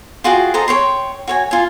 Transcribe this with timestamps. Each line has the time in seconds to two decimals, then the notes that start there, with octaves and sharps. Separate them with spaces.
0.24 F4 F#4 G#4 G5
0.54 A4 C5 D#5 A#5
0.68 C#5 G5 C6
1.28 F#4 C#5 G#5
1.51 F4 G#5